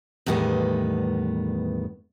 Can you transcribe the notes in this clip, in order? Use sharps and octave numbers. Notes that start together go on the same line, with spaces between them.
E2 A2 D#3 G3 B3